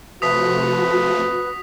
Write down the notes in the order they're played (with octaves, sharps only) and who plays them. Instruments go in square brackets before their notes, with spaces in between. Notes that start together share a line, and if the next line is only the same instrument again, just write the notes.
[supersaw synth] C3 F3 A3 [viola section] F#4 [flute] B4 [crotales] D#6 B6